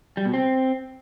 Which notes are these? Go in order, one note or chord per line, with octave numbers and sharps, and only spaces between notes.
G3
B2
C4